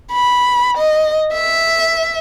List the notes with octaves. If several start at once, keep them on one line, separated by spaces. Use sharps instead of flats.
B5
D#5
E5